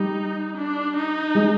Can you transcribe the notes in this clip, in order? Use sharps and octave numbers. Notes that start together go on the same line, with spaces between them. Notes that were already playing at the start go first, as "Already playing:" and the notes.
Already playing: G3 D#4
D4
D#4
G#3